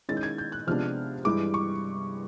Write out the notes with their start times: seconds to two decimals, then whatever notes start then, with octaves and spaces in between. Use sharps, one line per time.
0.09 D#3 G#3 C#4 E4 A6
0.17 G6
0.23 G#6
0.38 G6
0.52 F#6
0.67 C3 F3 G#3 B3 D4 F6
1.25 G2 E3 G#3 D6
1.54 C#6